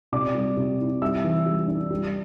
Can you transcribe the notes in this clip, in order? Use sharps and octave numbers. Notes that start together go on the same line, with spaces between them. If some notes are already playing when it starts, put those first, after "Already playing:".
C3 D5 D6
G3
C3
E4
G3 E5 E6
E3
G3
D4
G3